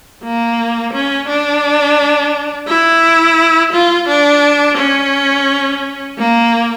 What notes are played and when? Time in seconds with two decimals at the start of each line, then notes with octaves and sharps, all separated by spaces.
0.23 A#3
0.93 C#4
1.28 D4
2.68 E4
3.73 F4
4.08 D4
4.77 C#4
6.18 A#3